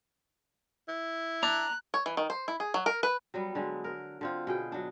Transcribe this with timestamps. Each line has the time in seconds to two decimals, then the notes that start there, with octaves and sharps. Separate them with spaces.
0.88 E4
1.43 D4 A#5 F#6
1.94 C#5
2.06 E3
2.17 D#3
2.30 C5
2.48 E4
2.60 G#4
2.74 F#3
2.86 A#4
3.03 B4
3.34 F#3 G3 B3
3.55 D3 F#3 G#3
3.84 A#4
4.21 D3 C4 F4
4.47 B2 G#4 G5
4.72 F#3 D4